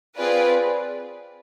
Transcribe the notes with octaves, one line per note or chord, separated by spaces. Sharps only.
C4 F4 G#4 B4 D5